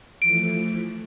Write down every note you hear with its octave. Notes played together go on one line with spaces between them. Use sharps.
E3 F3 A3 D7